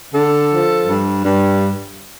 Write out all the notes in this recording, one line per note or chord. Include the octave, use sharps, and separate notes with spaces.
D3 A4
F3
G2
G2